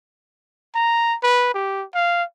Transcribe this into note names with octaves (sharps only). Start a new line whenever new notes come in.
A#5
B4
G4
F5